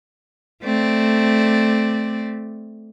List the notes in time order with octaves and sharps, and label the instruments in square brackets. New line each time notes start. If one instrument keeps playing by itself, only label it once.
[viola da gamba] A3 C4 D5